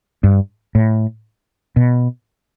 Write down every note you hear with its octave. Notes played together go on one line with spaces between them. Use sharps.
G2
A2
B2